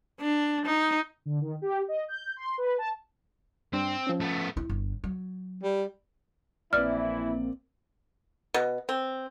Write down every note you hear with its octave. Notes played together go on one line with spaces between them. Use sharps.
D4
D#4
D3
D#3
G4
D#5
G6
C6
B4
A5
G2 C4 D4
F3 C#4
A3 B3
E4
G1
F#3
G3
A#1 E3 A#3 C4 E4 D5 F6
B2
C4